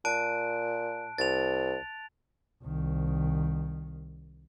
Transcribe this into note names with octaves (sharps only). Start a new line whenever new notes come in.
A#2 A5 F#6 D7
C2 A6 F7
C2 D#3